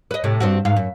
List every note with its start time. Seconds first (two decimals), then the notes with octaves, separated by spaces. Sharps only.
0.11 B4 D#5
0.24 A2 C3
0.40 G2 C4 F#4
0.65 G#2 F5
0.76 F#2